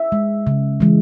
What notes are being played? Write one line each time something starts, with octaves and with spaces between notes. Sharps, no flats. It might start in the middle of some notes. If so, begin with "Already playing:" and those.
Already playing: E5
G#3
C#3
E3 G#3